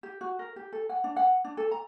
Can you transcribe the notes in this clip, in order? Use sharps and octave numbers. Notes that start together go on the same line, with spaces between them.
G4
F#4
A#4
G4
A4
F#5
D4
F#5
D4
A4
A#5